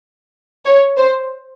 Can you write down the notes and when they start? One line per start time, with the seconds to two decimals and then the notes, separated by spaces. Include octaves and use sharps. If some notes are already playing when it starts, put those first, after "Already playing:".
0.65 C#5
0.97 C5